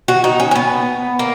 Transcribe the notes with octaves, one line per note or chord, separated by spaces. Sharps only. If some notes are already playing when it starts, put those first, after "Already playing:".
F#4
D#4
C#4
C#4
B3
A#3